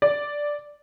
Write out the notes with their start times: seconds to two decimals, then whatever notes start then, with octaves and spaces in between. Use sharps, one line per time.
0.02 D5